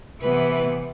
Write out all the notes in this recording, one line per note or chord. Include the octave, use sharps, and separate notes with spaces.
C3 E3 B3 B4